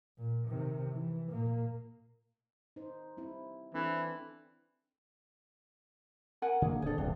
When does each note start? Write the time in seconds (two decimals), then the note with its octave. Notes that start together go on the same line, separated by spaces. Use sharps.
0.18 A#2
0.48 C3 D#3
0.90 E3
1.29 A#2 A#3
2.76 D#4 C5
3.17 G3 C4 E4
3.74 E3 C4 D4 A4
6.42 A#4 F#5 G#5
6.62 D3 A#3 G#4
6.82 D1 D4 G#4 A4
6.98 E1 C2 A#2 D4